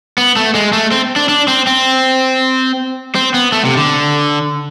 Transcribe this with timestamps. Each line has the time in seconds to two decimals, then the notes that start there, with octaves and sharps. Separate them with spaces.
0.18 B3
0.36 A3
0.55 G#3
0.73 A3
0.91 C4
1.16 D4
1.29 D4
1.48 C4
1.67 C4
3.15 C4
3.34 B3
3.52 A3
3.65 C3
3.77 D3